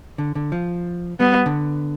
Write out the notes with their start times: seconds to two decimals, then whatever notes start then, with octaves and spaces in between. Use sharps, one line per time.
0.18 D3
0.35 D3
0.52 F3
1.20 G3 B3
1.46 D3